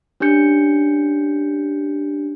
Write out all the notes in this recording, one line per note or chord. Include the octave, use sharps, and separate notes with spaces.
C#4 D4 G4 G6 C#7